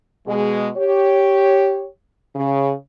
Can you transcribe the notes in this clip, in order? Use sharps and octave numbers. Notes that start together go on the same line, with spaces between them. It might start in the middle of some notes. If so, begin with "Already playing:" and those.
B2 G#3
G4 C#5
C#3